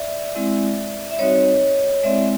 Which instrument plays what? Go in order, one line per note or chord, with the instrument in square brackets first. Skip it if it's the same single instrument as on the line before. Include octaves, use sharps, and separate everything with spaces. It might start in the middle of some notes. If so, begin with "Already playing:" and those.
Already playing: [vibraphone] D5 E5
G#3 C4 E4
E5
G3 C4 D#4 F#4 C#5 D#5
G#3 C4 E4 D5 E5